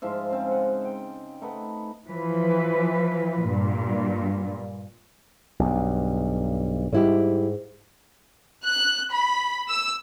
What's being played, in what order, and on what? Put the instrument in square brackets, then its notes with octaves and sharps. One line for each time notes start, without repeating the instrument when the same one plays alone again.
[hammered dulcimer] G#2 F3 F4 E5
C#3 C4
D#5 F#5
G5
A3 D#4 B4 F#5
[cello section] E3 F3 B4
G2 A#2
[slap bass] B1 G2
[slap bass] G#2 [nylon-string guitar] G3 E4 G4
[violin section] F#6
B5
E6